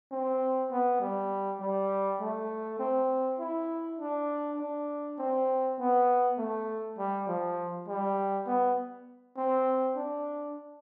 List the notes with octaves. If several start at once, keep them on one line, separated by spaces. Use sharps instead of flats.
C4
B3
G3
G3
A3
C4
E4
D4
D4
C4
B3
A3
G3
F3
G3
B3
C4
D4